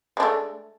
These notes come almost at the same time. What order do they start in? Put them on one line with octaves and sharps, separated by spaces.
G#3 D4 A3